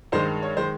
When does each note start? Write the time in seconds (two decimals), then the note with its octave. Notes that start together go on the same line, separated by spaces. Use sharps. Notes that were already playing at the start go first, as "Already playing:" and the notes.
0.12 G2 D#3 G#3 C5
0.43 C#5
0.57 D#3 G#3 C5